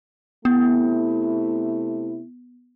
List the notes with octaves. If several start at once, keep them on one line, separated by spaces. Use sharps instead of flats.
C3 A3 B3 E4